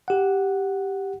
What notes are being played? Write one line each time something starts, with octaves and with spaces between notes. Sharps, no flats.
G4 F#5